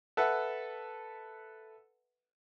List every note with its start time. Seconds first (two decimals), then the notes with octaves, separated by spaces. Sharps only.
0.17 A4 B4 E5 F#5